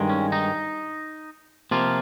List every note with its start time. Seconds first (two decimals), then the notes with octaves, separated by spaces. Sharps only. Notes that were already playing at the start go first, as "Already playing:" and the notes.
Already playing: G2 D#3 G#3
0.09 C#4
0.32 D#4
1.71 C3 F3 A#3 F4